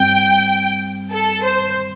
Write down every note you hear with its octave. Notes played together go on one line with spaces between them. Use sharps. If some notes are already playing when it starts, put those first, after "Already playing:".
Already playing: G2 G3 C4 G5
A4
C5